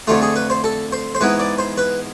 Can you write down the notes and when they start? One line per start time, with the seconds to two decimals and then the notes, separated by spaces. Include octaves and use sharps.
0.07 F2 D3 A3 F4
0.22 G#4
0.36 B4
0.50 C5
0.64 A4
0.92 C5
1.15 C5
1.21 G#2 E3 B3 B4
1.40 D5
1.59 C5
1.77 B4